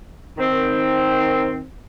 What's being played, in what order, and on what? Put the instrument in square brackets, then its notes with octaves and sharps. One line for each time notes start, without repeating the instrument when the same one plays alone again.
[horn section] D#3 C4